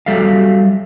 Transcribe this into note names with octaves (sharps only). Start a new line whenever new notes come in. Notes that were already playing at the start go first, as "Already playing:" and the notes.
F#3 G3 A4 E5 F5